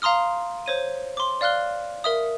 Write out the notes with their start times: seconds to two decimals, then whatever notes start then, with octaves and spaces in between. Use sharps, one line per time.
0.02 F5 A#5 C6 D#6 F6
0.66 C5 C#5 D#7
1.17 C6 D6
1.41 D5 F5 F6 F#6 G7
2.04 A#4 E5 D#6